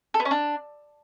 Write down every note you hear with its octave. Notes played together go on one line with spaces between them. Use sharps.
A4
B3
C#4
D4